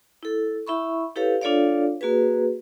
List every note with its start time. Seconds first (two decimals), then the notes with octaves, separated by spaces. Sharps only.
0.23 E4 A4
0.67 E4 E5 B5 C#6
1.16 E4 G4 A4 B4 C#5 F5
1.42 D4 F4 A4 C#5 D5 F5
2.01 A#3 F#4 G#4 B4